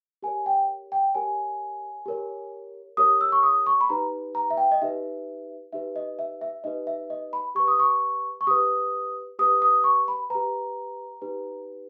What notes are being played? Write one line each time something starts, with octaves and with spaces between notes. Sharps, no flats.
G4 A#4 C#5 G#5
G5
G5
G4 A#4 C#5 G#5
G4 A#4 C#5
G4 A#4 C#5 D#6
E6
C#6
D#6
C#6
B5
D#4 G4 B4 A#5
A#5
E5
G5
D#5
D#4 G4 B4 E5
D#4 G4 B4 E5
D#5
E5
E5
D#4 G4 B4 D#5
E5
D#5
B5
G4 B4 C#6
D#6
C#6
C#6
G4 B4 D#6
G4 B4 D#6
D#6
C#6
B5
G4 B4 A#5
D#4 G4 B4